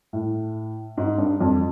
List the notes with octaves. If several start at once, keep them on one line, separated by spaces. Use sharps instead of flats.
A2
G#2
G2
F2